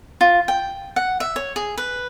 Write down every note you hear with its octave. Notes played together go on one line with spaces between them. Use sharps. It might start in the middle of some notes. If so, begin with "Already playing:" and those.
F4
G5
F#5
E5
C#5
G#4
B4